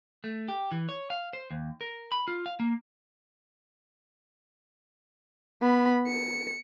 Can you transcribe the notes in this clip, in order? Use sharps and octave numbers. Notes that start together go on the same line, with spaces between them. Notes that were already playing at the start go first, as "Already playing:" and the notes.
A3
G4
E3
C#5
F5
C5
D#2
A#4
B5
F4
F5
A#3
B3 B5
C#7